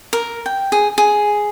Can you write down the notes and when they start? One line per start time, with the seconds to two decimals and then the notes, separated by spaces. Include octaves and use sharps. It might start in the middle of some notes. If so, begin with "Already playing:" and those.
0.13 A#4
0.46 G5
0.72 G#4
0.98 G#4